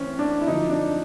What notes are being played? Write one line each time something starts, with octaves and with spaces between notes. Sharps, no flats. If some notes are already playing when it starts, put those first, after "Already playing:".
Already playing: A2 E3 C4 C#4
D4
E4
F#2 D3 F3 D#4
D4